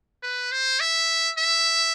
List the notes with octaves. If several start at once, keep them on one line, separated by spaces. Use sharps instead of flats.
B4
C5
E5
E5